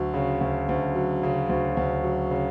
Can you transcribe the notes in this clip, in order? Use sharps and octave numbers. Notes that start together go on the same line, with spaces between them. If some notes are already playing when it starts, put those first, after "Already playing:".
Already playing: D2 F#3
C#3
D2
D2
F#3
C#3
D2
D2
F#3
C#3